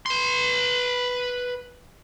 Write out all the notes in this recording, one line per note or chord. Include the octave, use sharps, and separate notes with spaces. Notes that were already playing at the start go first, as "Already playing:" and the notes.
B4 C6